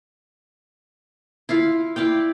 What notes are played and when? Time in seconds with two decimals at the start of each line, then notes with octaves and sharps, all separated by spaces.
1.49 E4 F4 F5
1.96 E4 D5 F5 G5